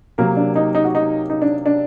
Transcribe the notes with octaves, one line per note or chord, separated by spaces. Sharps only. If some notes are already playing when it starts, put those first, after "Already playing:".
C3 F#3 A#3 A#4
D4
D#4
D#4
F#4
D#4
D#4
D4
D4